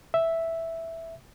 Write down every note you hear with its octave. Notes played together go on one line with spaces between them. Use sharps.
E5